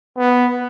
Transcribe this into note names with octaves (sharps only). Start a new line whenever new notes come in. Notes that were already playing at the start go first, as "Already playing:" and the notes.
B3